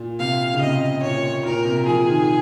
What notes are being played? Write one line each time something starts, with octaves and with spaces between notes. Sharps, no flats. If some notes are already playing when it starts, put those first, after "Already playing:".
Already playing: A#2
C3 F5
C#3
C3 D#5
A#2 C#5
A#2 A#4
C3
F3 G#4
D#3